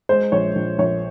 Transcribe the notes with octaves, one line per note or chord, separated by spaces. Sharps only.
G#3 C5
A#1 C#5
A#1
A#1 C#5